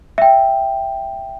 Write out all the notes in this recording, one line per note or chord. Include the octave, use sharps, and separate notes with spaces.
E5 G5